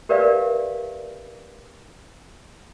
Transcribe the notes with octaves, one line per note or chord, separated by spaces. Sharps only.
G4 A#4 B4 D5 E5 F5